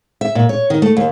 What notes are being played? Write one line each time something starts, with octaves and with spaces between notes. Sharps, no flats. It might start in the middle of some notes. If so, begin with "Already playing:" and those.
E5
A#2
C#5
D#3
A3
D#2